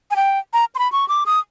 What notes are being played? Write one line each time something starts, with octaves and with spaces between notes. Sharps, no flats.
G#5
G5
A#5
C6
B5
C#6
D6
D#6